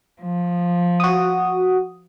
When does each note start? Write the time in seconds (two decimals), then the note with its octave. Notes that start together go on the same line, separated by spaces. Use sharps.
0.21 F3
1.00 F#4 D#6